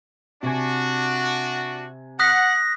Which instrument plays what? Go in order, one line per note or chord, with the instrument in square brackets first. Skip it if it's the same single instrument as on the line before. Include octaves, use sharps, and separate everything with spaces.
[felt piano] C3 G#5 [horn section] D4 F#4
[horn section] F#5 [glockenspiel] D#6 F#6 B6 [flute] A#6